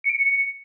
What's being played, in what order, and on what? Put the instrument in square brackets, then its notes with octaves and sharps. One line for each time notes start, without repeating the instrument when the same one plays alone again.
[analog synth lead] C#7
D7
C#7